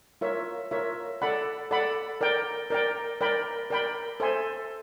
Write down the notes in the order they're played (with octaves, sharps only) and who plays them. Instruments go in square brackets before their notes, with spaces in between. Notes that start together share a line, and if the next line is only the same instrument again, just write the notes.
[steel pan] F4 A#4 C#5 E5
F4 A#4 C#5 E5
A4 D5 F#5 B5
A4 D5 F#5 B5
A#4 D5 G5
A#4 D5 G5
A#4 D5 G5 B5
A#4 D5 G5 B5
A4 C5 E5 G#5 C6